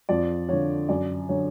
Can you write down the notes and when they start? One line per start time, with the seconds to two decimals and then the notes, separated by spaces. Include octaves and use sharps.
0.09 F2 D5
0.49 D3 F3 C#5
0.89 F#2 D5
1.29 D3 F#3 C#5